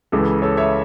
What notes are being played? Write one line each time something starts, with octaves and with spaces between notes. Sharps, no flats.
C#2 C#3 E3 A4
A4 C#5
C#5 E5